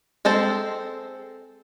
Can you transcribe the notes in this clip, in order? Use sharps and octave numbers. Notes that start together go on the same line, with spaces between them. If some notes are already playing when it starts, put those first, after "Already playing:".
G#3 C4 A4 C5